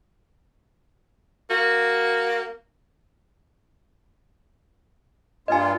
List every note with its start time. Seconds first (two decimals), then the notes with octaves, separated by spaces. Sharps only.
1.50 A#3 F#4
5.48 G2 A#2 F4 D#5 G#5